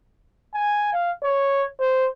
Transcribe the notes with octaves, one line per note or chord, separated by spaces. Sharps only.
G#5
F5
C#5
C5